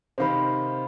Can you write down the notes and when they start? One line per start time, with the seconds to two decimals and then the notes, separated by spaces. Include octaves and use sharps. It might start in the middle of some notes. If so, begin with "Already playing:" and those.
0.18 C3 D#3 C5 F5 B5